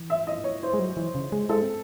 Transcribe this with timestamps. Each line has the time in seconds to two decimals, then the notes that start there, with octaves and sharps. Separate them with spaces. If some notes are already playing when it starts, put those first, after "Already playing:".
Already playing: E3
0.10 E5
0.27 D#5
0.44 C#5
0.63 C5
0.74 G#3
0.79 F#3
0.97 E3
1.15 C#3
1.32 G#3
1.49 G#3 A4
1.62 C4